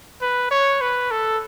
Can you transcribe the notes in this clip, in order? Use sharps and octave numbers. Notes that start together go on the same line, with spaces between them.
B4
C#5
B4
A4